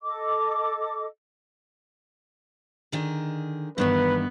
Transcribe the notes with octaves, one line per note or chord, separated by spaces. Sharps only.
A4 D#5 D6
D3 D#3 G#4
G2 D#3 E3 B3 B4